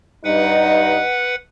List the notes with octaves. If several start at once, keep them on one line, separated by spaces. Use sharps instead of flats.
G2 D#4 B4 F#5